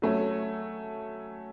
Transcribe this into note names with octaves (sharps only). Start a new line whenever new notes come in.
F#3 A3 C#4